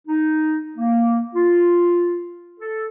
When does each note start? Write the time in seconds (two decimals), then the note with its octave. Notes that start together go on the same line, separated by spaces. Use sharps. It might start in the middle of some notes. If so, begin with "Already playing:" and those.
0.08 D#4
0.77 A#3
1.35 F4
2.60 A4